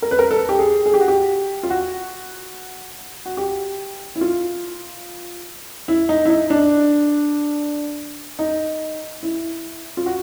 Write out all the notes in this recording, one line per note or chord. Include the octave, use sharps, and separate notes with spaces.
A#4
B4
A#4
A4
G4
G#4
G#4
G4
F#4
G4
F4
F#4
F#4
G4
E4
F4
E4
D#4
E4
D#4
D4
D#4
E4
F4
F#4